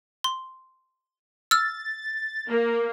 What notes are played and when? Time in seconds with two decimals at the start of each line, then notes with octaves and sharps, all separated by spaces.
0.24 C6
1.51 E6 F6 A6
2.48 A#3